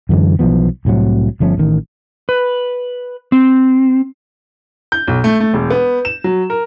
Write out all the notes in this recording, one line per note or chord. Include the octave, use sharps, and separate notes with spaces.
F#2 D3 E3 G#3
B1 E3 F3 B3
C2 A2 C3 F#3
G1 F3 A3 C#4
A1 D#3
B4
C4
G6
B1
A3
A3
E1
B3
E7
F#3
A#4